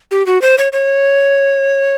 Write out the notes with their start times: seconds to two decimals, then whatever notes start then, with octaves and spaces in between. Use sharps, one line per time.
0.11 G4
0.26 F#4
0.42 C5
0.58 C#5
0.73 C#5